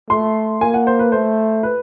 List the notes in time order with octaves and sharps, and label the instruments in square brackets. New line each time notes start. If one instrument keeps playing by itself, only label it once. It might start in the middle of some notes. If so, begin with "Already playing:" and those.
[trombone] A3 [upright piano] C6
[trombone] A#3 [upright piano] G#5
[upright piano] F#5
C5
B4
[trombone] A3 [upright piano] C5
[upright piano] B4